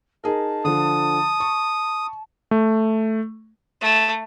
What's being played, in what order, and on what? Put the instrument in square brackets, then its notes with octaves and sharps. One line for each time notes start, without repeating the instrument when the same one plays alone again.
[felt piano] D#4 G#4 A#4 [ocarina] A5
[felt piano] D3 F3 [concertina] D#6
[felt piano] C#6
[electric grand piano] A3
[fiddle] A3